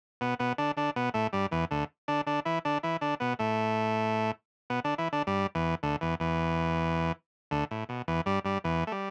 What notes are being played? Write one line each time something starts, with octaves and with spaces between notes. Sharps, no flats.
B2 B3
B2 B3
D3 D4
D3 D4
B2 B3
A2 A3
G2 G3
E2 E3
D2 D3
D3 D4
D3 D4
E3 E4
D3 D4
E3 E4
D3 D4
B2 B3
A2 A3
B2 B3
D3 D4
E3 E4
D3 D4
G2 G3
E2 E3
D2 D3
E2 E3
E2 E3
D2 D3
A2
B2
E2 E3
G2 G3
G2 G3
E2 E3
A3
G3